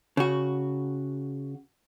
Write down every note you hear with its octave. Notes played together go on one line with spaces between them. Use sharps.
C#3 F#4